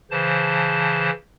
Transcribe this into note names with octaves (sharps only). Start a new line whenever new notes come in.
C#3 E3 C5 A5